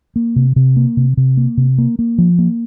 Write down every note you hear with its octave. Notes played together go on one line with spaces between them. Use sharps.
A#3
C3
C3
A#3
C3
C3
A#3
C3
A#3
A#3
F3
A#3